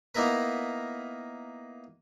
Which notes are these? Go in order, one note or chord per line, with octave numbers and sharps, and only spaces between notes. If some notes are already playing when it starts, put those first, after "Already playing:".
A#3 B3 D#4 E4 A#4 B4